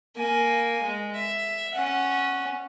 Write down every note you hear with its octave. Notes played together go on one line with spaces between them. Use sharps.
A#3 G#5
G#3
E5
C#4 F#5